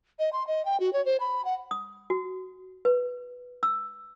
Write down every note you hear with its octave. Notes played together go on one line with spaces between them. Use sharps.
D#5
C6
D#5
G5
F#4
C#5
C5
B5
F#5
D#6
F#4
B4
E6